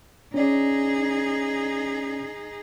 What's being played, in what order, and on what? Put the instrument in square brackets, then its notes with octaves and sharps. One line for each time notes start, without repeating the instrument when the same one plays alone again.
[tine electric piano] C#4 D5 [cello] D#4 G#4